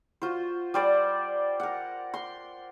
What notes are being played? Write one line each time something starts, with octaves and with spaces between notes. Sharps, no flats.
F4 F#4 C5
G3 C5 D5 F#5
A#4 F#5
C6